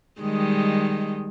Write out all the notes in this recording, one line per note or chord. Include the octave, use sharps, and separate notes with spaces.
D#3 G3 G#3